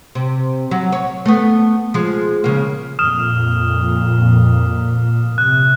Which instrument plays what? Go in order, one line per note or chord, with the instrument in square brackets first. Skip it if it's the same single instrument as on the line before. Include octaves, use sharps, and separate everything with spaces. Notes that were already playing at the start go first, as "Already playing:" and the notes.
[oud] C3
F#3
C#5
A3 B3
F3 G#3
C#3 A#3
[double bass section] F2 A#2 [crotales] D#6 F6 E7
[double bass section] C3 [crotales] F#6